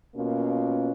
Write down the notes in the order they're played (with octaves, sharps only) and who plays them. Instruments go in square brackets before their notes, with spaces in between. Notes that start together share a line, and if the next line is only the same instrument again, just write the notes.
[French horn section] B2 A#3 C#4 F4